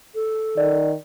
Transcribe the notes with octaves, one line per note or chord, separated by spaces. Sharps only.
A4
D#3 D5